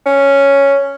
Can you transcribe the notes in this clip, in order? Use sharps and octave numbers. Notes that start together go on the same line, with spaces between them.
C#4